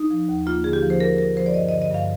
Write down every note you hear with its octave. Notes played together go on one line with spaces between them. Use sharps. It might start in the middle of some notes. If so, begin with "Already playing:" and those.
Already playing: D#4
F3
D#2
A#3 F4
D3 G#4
G4
F3
C5
A#3 A#4
F3 A#4
F3 C5
D5
G2 D#5
D3 D#5
D#5
G2 F5